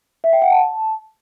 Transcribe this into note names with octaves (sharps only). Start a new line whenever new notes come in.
E5
G5
F#5
A5